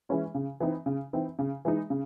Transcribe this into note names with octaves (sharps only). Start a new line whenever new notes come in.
E3 G#3 C#4 E4
C#3
E3 C4 D#4
C#3
E3 C4 D#4
C#3
E3 G#3 D#4
C#3